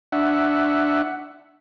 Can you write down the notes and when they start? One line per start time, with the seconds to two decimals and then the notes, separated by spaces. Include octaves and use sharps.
0.12 D4 E5 F#5